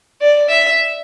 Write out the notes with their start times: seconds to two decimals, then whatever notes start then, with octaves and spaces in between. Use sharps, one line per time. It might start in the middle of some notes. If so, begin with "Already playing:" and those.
0.21 D5
0.49 E5